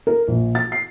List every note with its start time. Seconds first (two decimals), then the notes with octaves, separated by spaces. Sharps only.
0.07 A#4
0.28 A#1
0.55 A6
0.72 C7